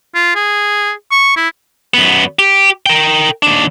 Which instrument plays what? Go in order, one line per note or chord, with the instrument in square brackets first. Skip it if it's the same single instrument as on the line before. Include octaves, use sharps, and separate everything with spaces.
[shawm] F4
G#4
C#6
E4
[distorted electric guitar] F#2 B3
G4
A#4 G5
D#2 D4